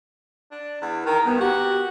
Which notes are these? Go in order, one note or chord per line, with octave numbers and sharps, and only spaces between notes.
D4
E2
D#3 A#4
G2 B3
F#4 G4